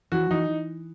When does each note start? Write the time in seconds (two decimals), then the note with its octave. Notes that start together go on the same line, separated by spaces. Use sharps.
0.12 E3 F#4
0.31 E3 D#4